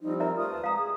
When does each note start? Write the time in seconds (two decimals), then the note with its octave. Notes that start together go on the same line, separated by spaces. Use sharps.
0.01 F3 G3 C4 D#4
0.20 A#4 D5 E5 A#5
0.37 A3 F4 A#4 D#6
0.51 D#2 B4 A5
0.64 G#3 F5 A#5
0.77 G#4